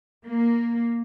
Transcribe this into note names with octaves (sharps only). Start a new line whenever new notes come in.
A#3